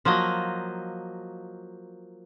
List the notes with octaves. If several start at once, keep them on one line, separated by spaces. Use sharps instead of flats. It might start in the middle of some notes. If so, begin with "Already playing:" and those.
F3 F#3 A#3 D#5